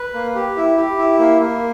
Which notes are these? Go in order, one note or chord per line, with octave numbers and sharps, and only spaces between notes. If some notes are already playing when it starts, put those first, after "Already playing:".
Already playing: B4
A#3
G4
E4
G4
E4
A#3
A#3